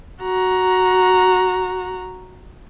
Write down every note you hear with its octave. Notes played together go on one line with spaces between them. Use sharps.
F#4 A#5